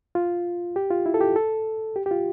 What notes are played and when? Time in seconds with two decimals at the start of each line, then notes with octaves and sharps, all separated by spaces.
0.15 F4
0.76 G4
0.91 F4
1.06 E4
1.14 A4
1.21 G4
1.36 A4
1.96 G4
2.06 G4
2.11 F4